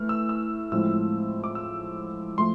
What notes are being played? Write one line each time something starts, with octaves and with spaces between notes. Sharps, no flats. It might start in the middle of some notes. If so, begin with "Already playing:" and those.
Already playing: E3 A3 F6
E6
E6
A2 F3 G#3 C4 E6
D6
E6
F3 A3 C6